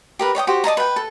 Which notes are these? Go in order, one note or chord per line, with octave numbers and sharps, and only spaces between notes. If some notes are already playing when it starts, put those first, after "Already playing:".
G4 A#4 B4
C#5 D5 G5 D#6
F#4 G4 C5
D5 D#5 A5 A#5
B4 G5
A4